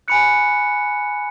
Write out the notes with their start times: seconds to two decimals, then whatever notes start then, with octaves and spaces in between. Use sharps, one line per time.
0.08 G#5 B5 F#6 C#7